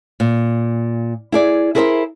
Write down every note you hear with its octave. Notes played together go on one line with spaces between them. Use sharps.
A#2
E4 G#4 D5
E4 G#4 A#4 C5 D#5 E5